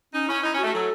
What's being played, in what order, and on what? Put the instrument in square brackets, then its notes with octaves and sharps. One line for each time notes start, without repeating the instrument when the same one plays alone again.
[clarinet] C#4 [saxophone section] D#4
[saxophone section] C#4 [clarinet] E4
[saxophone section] D#4 [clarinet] E4
[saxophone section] C#4 [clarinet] F#4
[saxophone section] A3
[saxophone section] F#3 [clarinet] A4